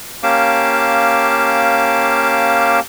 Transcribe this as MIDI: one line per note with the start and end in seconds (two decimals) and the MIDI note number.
0.23 2.80 58
0.23 2.80 61
0.23 2.80 67
0.23 2.80 77
0.23 2.80 81
0.23 2.80 86